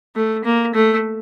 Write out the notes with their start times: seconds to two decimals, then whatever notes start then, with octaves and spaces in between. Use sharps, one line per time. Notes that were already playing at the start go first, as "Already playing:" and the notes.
0.16 A3
0.44 A#3
0.74 A3